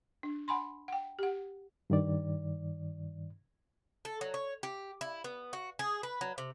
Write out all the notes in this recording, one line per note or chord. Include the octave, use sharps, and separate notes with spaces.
D4
F#5 G#5 B5 C6
F#5 G5
G4 F#5
G2 D#3 D5
A4
F#3
C#5
G4
E4
B3
F#4
G#4
B4
F#3
C3